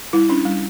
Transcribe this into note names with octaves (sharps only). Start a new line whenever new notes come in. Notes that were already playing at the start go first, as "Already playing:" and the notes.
G3 E4
C#4 D4
G3